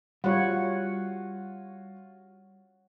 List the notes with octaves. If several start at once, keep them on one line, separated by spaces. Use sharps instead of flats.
G3 F4 F#4 C#5 F#5